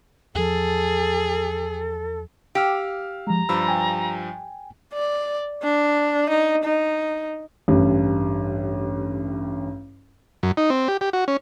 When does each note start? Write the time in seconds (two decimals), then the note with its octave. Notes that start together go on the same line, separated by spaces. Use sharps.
0.35 E2 F3 G#4 A4
2.55 G4 F5 E6 F6
3.27 F3 G#3 A#5
3.49 G2 F3 B5 E6
3.68 G5 G#5
4.94 D5
5.63 D4
6.29 D#4
6.64 D#4
7.68 A1 G2
10.43 F#2
10.57 D#4
10.70 C4
10.88 G4
11.01 G4
11.13 F#4
11.28 C#4